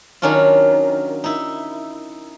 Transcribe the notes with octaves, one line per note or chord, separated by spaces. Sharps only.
D#3 F#3 C#4 D4 F4
D#4 E4